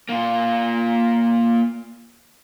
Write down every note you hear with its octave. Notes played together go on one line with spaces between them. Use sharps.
A#3 F4